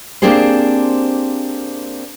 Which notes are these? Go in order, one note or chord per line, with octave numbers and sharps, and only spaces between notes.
A#3 C4 D4 G4 G#4 C5